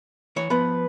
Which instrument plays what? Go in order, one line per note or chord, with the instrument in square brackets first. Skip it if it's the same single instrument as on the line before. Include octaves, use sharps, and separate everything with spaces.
[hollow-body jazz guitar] E3 C#5
[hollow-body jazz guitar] F3 B3 [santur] B4